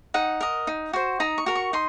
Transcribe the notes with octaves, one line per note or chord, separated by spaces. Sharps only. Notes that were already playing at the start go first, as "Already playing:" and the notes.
D#4 F#5
A#4 D#5
D#4
F#4 C5
D#4 A#5
C#6
F#4 A#4
C#6
D#4 C6